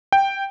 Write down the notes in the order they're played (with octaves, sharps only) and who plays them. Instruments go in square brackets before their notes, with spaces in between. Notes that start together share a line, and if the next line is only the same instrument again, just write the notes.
[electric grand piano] G5